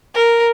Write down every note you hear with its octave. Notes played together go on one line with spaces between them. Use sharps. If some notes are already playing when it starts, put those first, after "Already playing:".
A#4